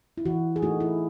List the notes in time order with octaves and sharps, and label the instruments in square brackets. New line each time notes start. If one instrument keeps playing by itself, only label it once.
[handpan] E4
E3 F#4
G#4
A3 D#4 F#4
E4